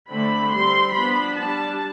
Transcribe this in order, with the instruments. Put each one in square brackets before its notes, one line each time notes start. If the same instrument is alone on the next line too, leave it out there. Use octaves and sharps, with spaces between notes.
[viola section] D3 A3 C4 B5
G3 C4 C6
F3 B3 D4 B5
G3 D4 A5